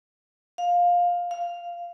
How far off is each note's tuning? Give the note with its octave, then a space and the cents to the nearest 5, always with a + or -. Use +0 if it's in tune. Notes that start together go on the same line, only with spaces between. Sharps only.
F5 +15
F5 -5